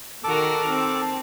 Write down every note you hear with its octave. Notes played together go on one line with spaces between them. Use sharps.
D#3 F#4 A4 A#4 D6
C4